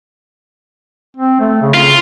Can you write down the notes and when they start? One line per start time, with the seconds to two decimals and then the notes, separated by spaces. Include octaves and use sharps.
1.17 C4
1.40 A3
1.62 C#3
1.74 C#3 F4